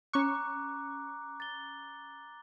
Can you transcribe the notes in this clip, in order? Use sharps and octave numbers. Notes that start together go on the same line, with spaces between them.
C#4 A#5 C#6 D6 F#6
A6 G7